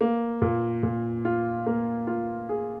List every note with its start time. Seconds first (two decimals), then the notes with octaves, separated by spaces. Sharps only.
0.01 A#3
0.42 A#2
0.83 A#2
1.25 F4
1.66 A#3
2.07 F4
2.49 G#4